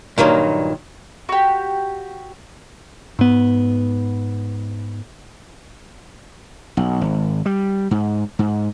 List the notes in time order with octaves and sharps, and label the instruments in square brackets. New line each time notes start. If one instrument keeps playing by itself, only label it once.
[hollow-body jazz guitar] G2 A#2 D#3 F#3
[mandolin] F#4 G4
[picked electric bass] G#2 B3
[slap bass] B1
G#1
G3
G#2
G#2